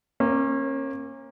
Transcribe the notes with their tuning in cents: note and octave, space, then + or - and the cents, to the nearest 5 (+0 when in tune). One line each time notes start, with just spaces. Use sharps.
A#3 +0 C#4 -35